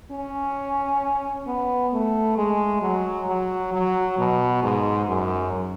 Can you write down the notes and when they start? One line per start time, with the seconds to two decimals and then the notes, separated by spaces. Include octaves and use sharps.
0.12 C#4
1.47 B3
1.93 A3
2.37 G#3
2.82 F#3
3.28 F#3
3.73 F#3
4.18 B2
4.63 G#2
5.09 F#2